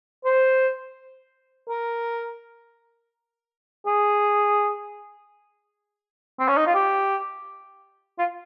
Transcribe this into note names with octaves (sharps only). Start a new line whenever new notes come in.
C5
A#4
G#4
C4
C#4
D#4
F4
G4
F4